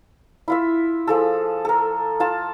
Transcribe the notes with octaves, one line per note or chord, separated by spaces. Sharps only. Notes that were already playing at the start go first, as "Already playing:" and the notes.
E4 F4 E5
F3 G#4 A4
A4 A#4
F4 A5